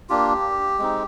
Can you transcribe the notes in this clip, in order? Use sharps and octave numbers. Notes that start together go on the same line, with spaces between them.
A#3 D4 F4 G4
G#3 C4 D#4